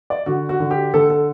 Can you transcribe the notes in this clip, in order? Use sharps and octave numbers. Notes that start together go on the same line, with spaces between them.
D5
D3 F#4
F#4
D3
G4
D3 A4
A4